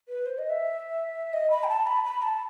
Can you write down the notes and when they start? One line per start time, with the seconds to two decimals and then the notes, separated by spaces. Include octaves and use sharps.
0.09 B4
0.26 C5
0.38 D#5
0.50 E5
1.33 D#5
1.50 B5
1.64 G5
1.69 A5
1.87 B5
2.05 B5
2.22 A5